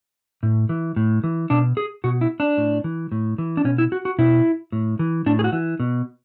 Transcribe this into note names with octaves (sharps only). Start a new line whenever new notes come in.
A2
E3
A2
E3
B2 D4
G#4
B2 F#4
E4
D4
A2
E3
A2
E3
D4
B2 C#4
E4
F#4
F#4
B2 E4
A2
E3
A2 D4
G#4
F#4
E3
B2